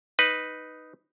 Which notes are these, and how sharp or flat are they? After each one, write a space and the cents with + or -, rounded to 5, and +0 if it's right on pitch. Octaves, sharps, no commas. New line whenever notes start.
D#4 +0 B4 +0